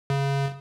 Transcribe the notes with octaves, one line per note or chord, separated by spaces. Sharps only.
C#3